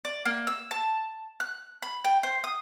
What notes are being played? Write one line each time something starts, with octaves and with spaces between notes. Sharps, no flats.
D5
A#3
E6
A5
F#6
B5
G5
C5
D#6